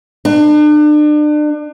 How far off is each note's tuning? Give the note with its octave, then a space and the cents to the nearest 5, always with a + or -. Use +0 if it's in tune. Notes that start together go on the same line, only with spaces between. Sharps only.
D4 +35